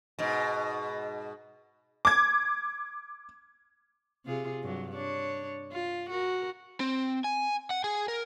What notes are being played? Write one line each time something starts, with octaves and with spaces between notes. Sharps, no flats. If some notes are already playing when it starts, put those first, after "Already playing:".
G#2 B2
D6 G#6
C3 F4 G#4
G2 F#3
D4 C#5
F4
F#4 A#4
C4
G#5
F#5
G#4 G#5
A#4